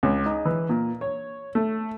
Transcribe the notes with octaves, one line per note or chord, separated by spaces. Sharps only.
C#2
D#4
E3
A#2
C#5
A3